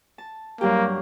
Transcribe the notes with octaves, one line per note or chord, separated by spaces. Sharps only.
A5
G2 F#3 A#3 G4